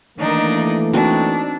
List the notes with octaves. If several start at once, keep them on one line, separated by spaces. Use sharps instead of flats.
D#3 E3 A3 A#3 D4 D#4
C4 D4 D#4 F#4